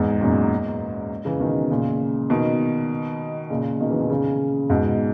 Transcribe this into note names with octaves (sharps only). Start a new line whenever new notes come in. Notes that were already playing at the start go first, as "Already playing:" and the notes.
Already playing: E2 G#2
F#2 A#2
C#3 E3
B2 D#3
A#2 C#3
B2 D#3
A#2 C#3
B2 D#3
C#3 E3
B2 D#3
A#2 C#3
G#2 B2